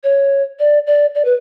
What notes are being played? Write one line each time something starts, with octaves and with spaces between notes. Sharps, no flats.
C#5
D5
D5
D5
B4